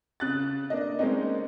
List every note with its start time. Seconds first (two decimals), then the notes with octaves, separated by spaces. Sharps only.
0.20 C#3 F#6 A6
0.70 A#3 D4 D#5
0.99 G#3 A#3 C4 C#4 D#4